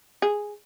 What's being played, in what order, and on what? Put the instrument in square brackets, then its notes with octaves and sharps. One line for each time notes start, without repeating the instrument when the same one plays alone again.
[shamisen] G#4